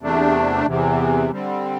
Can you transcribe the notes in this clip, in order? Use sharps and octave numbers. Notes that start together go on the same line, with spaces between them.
E2 C3 A3 D4
E2 C3 E3
D3 G3 C4